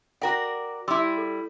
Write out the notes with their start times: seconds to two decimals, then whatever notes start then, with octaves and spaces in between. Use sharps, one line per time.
0.22 F#4 A#4 D5 F#5 G5 A#6
0.88 G3 E4 C6 D6 E6
1.17 A4